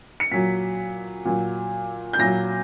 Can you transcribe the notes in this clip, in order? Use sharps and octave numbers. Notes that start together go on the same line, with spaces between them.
C#7
A#2 F#3 B6
A#2 F#3
G6
A#2 F#3 A#6